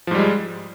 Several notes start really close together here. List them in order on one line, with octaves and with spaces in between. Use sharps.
F3 G#2 G3 G#3